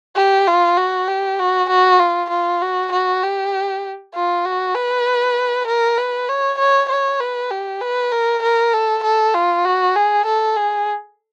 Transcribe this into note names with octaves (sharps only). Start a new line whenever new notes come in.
G4
F4
F#4
G4
F#4
F#4
F4
F4
F#4
F#4
G4
F4
F#4
B4
A#4
B4
C#5
C#5
C#5
B4
G4
B4
A#4
A#4
A4
A4
F4
F#4
G#4
A4
G#4